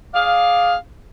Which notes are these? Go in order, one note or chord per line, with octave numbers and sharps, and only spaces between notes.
G#4 D5 F5